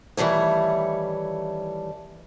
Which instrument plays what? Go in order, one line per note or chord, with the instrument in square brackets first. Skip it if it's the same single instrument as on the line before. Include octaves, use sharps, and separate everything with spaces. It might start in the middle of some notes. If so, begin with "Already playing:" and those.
[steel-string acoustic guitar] D#3 E3 G3 A3 C#5